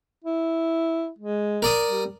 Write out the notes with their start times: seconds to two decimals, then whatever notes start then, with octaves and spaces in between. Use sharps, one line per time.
0.24 E4
1.19 G#3
1.62 A#4 D5 D#6
1.90 G3